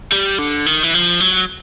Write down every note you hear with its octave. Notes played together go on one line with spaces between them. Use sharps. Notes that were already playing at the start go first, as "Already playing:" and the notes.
G3
D3
D#3
E3
F3
F#3